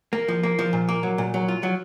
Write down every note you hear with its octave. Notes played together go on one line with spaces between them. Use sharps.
A#3
F3
A#3
F3
A#2
A#3
F#3
A#2
F#3
F4
F#3